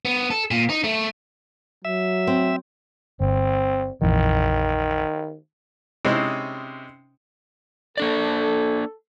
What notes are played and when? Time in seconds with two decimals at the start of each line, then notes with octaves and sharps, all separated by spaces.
0.05 B3
0.31 A4
0.51 A#2
0.70 D#4
0.84 A3
1.85 F#3 E5
2.27 C4
3.20 G1 C4
4.02 A#1 F2 D#3 E3
6.05 C3 G#3 C#4 D#4 E4 C5
7.97 A#3 D4 A4 D5